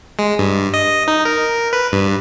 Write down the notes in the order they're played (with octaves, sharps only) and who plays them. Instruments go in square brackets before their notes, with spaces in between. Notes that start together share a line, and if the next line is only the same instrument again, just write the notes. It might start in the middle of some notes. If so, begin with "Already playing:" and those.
[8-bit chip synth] G#3
G2
D#5
D#4
A#4
B4
G2